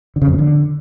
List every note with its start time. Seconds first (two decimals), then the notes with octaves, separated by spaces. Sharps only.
0.16 D3
0.22 C#3
0.27 F2
0.33 A#2
0.39 D3